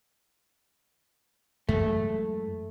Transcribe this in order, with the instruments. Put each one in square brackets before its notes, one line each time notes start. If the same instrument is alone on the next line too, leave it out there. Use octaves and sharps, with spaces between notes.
[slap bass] F#2 E3 G#3 [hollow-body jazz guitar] A3